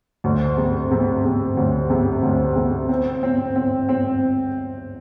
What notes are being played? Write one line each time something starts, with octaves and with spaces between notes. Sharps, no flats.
D2
C3
C3
C3
D2
C3
D2
C3
C4
C4
C4
C4